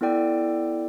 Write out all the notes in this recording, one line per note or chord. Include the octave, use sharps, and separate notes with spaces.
B3 E4 A4 D5 G5